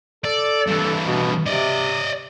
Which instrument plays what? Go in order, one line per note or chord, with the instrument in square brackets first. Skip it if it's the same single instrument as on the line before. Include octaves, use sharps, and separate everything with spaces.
[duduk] A4 [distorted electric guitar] D5
[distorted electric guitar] G2 E3
[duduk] B2
[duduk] C3 [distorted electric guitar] D5 D#5